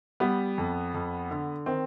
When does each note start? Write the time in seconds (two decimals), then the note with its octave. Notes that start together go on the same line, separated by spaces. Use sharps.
0.20 G3 B3
0.58 F2
0.94 F2
1.31 D3
1.66 D#3 C4